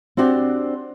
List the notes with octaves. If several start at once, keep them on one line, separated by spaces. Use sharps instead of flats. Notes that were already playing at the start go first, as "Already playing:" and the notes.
C4 D4 F#4 G4 C5 D5